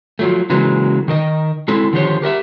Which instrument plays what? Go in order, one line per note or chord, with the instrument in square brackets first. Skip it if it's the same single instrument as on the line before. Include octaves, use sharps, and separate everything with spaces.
[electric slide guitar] F3 F#3 A3
C#3 E3 F#3 G#3 A#3
D#3 A#4 D#5
G#3 C4 E4 A4
D3 D#3 F3 G4 C5 C#5
G4 A#4 D#5 E5